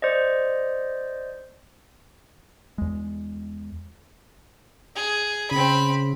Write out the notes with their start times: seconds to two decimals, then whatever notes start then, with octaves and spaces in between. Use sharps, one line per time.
0.02 C5 D5 D#5
2.78 E2 G#3
4.96 G#4
5.51 C#3 C4 B5